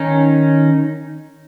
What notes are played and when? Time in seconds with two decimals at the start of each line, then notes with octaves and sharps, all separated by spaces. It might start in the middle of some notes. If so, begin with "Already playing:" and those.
Already playing: D#3 C#4 D#4